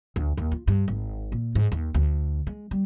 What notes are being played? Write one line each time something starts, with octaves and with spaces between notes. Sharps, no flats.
D2
D#2
F4
G2
G#1
A#2
G#2
D#2
D2
G#3
G3